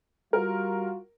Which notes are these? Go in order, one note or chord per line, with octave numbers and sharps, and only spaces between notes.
G3 F4 F#4 A#4